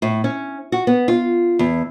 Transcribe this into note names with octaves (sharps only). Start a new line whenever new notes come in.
A2
C#4
F#4
B3
F4
E2